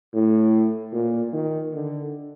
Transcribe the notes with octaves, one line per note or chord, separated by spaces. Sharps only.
A2
A#2
D#3
D3